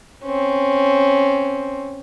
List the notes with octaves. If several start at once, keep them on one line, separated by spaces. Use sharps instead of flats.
C4 C#4